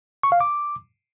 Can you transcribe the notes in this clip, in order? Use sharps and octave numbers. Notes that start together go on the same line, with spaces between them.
C#6
F5
D6